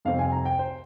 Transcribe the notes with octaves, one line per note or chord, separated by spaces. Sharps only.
F2 C3 G3 C4 F5
G#5
A#5
G5
C5